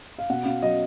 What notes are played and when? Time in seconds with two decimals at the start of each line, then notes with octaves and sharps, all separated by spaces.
0.19 F5
0.30 B2 F#5
0.45 B2 F5
0.62 F#3 D#5